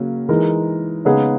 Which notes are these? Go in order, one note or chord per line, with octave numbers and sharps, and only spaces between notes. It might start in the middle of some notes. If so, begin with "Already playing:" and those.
Already playing: C#3 F#3 A#3 C#4
E3 G#3 D#4 A#4
C#3 G#3 B3 D#4 G#4